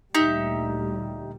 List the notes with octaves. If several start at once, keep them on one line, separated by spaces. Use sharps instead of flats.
D2 A#2 G3 D#4 G4 E5